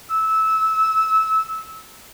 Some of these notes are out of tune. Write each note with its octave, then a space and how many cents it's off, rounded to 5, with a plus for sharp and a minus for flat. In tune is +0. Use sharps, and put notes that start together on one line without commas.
E6 -20